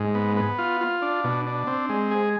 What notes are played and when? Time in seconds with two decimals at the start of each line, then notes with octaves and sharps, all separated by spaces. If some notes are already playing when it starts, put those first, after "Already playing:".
Already playing: G#2
0.15 B3
0.37 B3
0.59 F4
0.81 F4
1.02 D4
1.24 B2
1.46 D4
1.67 C4
1.89 G#3
2.11 G#4